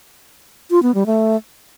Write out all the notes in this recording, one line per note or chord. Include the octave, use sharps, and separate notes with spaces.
F4
B3
G3
A3